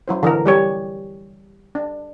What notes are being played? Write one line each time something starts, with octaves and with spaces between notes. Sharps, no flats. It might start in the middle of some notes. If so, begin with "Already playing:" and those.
F#3 E4 C5
D3 E3 F#3 A#4
G3 G4 C#5
D4